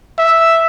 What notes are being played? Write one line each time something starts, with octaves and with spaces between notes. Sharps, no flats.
E5